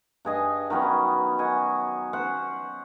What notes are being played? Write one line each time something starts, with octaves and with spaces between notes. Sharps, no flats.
G2 G#4 D#5 G#5
D#3 F#3 B3 C#4
F#4 D#5 G#5
C#4 C5 F#5